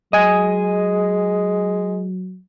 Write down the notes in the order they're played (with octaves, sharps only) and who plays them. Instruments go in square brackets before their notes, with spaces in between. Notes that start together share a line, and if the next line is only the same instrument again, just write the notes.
[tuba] F#3 [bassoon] G#3 [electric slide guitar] D#5 G#5